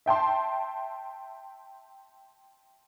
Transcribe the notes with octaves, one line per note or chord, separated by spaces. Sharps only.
E5 G5 A5 C6